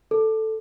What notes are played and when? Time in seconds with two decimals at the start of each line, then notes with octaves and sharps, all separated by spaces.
0.11 A4